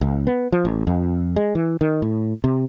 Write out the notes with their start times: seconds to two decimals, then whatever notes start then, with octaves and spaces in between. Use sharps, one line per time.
0.01 C#2
0.27 B3
0.52 F3
0.65 A1
0.87 F2
1.36 G#3
1.55 E3
1.81 D#3
2.02 A2
2.44 C3